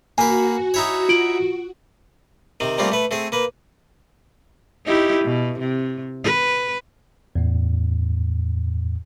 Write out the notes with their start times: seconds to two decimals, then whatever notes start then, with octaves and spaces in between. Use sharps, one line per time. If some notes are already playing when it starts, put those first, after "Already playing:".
0.18 A#3 F#4 B4 G#5
0.74 D#4 E4 C#5
1.09 F4 D7 F#7
2.60 C3 D#3 C4
2.78 F3 G3 A3 A#3 C4 F4
2.92 A3 B4
3.11 A3 C4 G#4
3.32 A#3 B4
4.86 D#4 E4 G4
5.24 B2
5.59 C3
6.24 B4
7.35 E2 A2